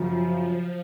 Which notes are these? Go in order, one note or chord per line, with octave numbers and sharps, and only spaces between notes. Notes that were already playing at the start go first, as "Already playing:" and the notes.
Already playing: F#2 C#3 F3 F#3